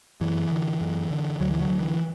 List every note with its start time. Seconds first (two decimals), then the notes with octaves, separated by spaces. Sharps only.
0.21 F#2 E3
0.51 D3
0.81 F#2
1.11 D3
1.40 D2 D3 F#3
1.51 E3
1.60 D3 F#3
1.70 D3
1.80 E3